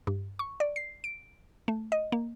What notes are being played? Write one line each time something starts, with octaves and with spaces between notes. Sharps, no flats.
G2
C#6
D5
C7
D7
A3
D#5
A#3